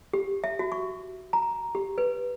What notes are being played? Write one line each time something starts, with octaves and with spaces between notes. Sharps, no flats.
G4
E5
F#4
C#6
A#5
G4
B4